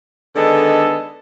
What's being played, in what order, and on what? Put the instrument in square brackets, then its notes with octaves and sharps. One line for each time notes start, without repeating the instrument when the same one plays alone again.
[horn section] D3 D#3 G#3 B3 A4